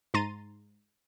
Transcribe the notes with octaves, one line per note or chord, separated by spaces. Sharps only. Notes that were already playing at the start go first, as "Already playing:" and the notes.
G#2 A#5 C6 A6 D#7